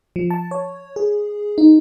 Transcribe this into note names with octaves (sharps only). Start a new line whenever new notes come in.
F3
A5
C#5
G#4
D#4